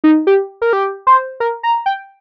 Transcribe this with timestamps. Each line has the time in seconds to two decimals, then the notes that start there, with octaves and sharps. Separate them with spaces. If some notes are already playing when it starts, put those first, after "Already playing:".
0.04 D#4
0.27 G4
0.62 A#4
0.73 G4
1.07 C5
1.40 A#4
1.63 A#5
1.86 G5